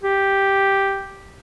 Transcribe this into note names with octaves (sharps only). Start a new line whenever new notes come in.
G4